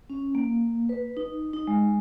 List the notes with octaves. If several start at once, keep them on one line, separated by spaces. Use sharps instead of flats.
C#4
A#3
B4
D#4
D#4
G#3